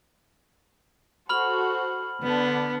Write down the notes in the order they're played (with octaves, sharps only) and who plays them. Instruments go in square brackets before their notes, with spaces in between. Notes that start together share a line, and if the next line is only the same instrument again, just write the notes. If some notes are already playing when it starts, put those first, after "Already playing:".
[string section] F#4 A4 C5 [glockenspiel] B5 F6 F#7
[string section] D3 D4 [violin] B3